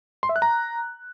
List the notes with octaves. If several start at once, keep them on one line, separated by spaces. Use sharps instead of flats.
C6
E5
F#6
A#5